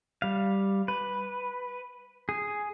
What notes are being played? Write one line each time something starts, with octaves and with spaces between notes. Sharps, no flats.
G3 F5
B4
G#4